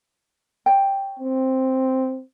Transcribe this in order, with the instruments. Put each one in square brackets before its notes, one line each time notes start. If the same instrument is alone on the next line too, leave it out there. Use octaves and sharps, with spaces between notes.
[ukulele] C#5 G5
[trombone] C4